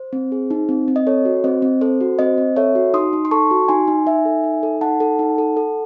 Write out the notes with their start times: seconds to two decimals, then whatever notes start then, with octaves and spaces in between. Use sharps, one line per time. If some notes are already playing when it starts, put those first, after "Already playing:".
Already playing: C5
0.13 C4
0.32 G#4
0.51 D#4
0.69 C4
0.88 C4
0.96 D#5
1.07 A4 C#5
1.25 F#4
1.44 C4 C5 D#5
1.62 C4
1.81 A4 C5
2.01 F#4
2.19 C4 C5 D#5
2.38 C4
2.56 A4 C#5 E5
2.75 F#4
2.94 D#4 C6 D#6
3.13 D#4
3.25 C6
3.31 A4 A5 C#6
3.51 F#4
3.68 D#4 G#5 C6
3.88 D#4
4.06 D#4 E5 G#5
4.25 A4
4.44 D#4
4.63 A4
4.81 D#4 F#5 A5
5.00 A4
5.19 D#4
5.38 A4
5.57 A4